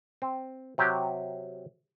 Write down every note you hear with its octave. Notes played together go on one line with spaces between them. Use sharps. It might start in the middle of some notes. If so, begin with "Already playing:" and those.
C4
C3 F#3 G4